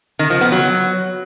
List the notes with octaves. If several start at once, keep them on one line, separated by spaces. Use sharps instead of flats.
D#3
F3
B3
F#3